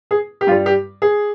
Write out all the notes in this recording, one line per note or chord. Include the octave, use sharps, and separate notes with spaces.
G#4
G4
G2 G3 F4
G4
G#4